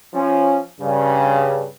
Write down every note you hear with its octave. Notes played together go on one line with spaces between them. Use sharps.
F3 C#4
G2 C#3